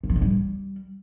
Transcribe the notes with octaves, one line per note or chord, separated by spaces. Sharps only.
A#2
F3
A2
G3